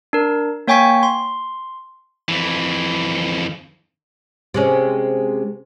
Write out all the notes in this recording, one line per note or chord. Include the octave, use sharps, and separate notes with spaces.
D4 A#4
A#3 C#5 G5 G#5 C#6 B6
C6
F2 E3
C3 G#3 C#4